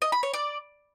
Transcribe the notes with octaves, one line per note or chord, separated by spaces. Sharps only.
D#5
B5
C#5
D5